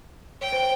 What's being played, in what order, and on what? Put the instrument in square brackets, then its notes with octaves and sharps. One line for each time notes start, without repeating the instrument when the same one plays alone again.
[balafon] C#5 [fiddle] G5
[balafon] C5